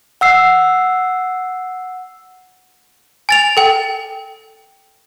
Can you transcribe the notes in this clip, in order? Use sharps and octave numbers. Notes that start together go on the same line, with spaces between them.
F#5 E6 C7
G#5 A6 F7
A4 G5